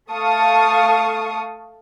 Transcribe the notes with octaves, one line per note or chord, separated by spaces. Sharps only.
A3 A4 F5 A5 C#6 D#6